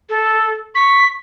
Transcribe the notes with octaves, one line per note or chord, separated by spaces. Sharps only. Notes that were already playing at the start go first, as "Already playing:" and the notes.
A4
C#6 B6